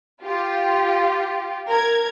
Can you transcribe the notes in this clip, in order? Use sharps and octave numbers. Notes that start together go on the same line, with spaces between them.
F4 G4
A#4 G#6